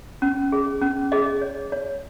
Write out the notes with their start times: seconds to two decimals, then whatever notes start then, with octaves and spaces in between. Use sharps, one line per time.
0.22 C#4
0.52 G#4
0.82 C#4
1.12 G#4 D#5
1.41 C#5
1.72 C#5